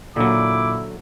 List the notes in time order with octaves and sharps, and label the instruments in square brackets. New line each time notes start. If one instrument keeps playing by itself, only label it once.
[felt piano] A#2 [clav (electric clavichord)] D3 F#3 [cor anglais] E4 [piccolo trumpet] D6